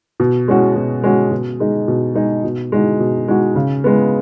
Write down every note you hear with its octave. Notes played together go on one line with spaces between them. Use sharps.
B2
G#3 C#4 F#4
B2
G#3 C#4 F#4
B2
G#3 D#4 G#4
B2
G#3 D#4 G#4
B2
G#3 D#4 F#4
B2
G#3 D#4 F#4
C#3
G#3 B3